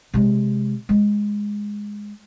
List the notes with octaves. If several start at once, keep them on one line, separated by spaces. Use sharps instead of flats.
C3 G#3
G#3